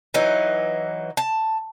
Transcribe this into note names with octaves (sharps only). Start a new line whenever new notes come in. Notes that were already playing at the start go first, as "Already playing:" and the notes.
E3 F#3 D#4
A5